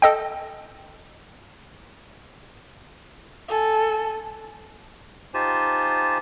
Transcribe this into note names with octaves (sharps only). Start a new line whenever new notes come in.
A4 D#5 G5
A4 G#5
D#4 F4 G4 C5 G#5 A5